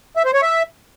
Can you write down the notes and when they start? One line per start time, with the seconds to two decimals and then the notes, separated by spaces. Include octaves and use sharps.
0.16 E5
0.25 C5
0.34 C#5
0.42 E5